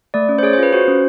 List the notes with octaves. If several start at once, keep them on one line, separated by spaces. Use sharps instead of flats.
A3 D5
C#4
C5
G#4 C#5
C5
F4 B4
F#4 C5
C#4